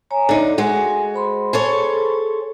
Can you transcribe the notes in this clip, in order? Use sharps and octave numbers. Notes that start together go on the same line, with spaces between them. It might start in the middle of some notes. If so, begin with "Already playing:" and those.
C#5 G#5 A#5
D3 D#4 D5
G#3 F#4 G#5
C5 B5 C6
G#4 A4 C#5